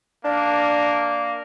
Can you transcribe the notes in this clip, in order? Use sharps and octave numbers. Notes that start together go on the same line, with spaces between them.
A#3 D4